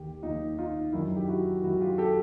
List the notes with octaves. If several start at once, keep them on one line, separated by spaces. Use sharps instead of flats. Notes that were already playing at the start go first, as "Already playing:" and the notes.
Already playing: D#2 D#3 G4
D#2 D#3 D#4 F4
D#4 F4
F#2 D#3 D4 E4
G4
E4 F#4
F#2 D#3 E4 F#4
F4 G4
G4 A4